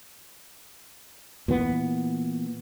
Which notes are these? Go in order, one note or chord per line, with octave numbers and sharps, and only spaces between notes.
A#2 E3 B3